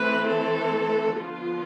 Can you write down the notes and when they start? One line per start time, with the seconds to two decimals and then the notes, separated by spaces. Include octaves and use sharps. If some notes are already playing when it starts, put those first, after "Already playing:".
Already playing: E3 A3 C4 B4
0.30 A4
1.21 D3 F3 B3 F4